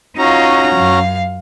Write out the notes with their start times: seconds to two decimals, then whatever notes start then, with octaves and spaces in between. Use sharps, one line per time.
0.18 C#4 D#4 F4 F#4 A#5
0.76 F#2 F5